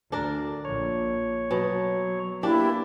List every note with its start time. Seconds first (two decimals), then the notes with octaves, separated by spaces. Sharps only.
0.12 D2 D4 A#4
0.65 A#1 C#5
1.51 B2 F#3
2.43 A#3 D4 E4 G4